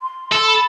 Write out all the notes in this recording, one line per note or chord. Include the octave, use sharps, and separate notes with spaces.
C6
A4
B5